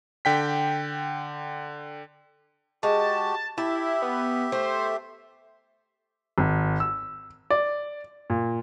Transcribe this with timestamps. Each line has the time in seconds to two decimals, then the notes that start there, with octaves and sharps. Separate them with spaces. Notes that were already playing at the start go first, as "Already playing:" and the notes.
0.25 D3 G5 B6
2.83 G#3 F#4 G4 A5
3.58 E4 G4 E5 A5
4.02 B3
4.52 A3 C5
6.38 G#1
6.80 E6
7.50 D5
8.30 A#2